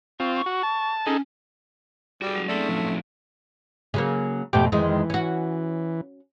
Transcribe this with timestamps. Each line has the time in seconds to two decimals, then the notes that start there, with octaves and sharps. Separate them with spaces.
0.20 C4 F4 C#6
0.35 C#6
0.46 F#4
0.63 A5
1.06 C#4 D#4 G#4 A4
2.22 G3 F#4 G#4
2.35 F#3 G#3 C#4
2.48 A3 C4 C#4 D#4 G#4 D5
2.69 A2 F3 F#3
3.94 C#3 F#3 A#3
4.53 F2 B2 A3 G4 G5 D6
4.72 F2 D#3 E3 G#3
5.10 C#4 F#4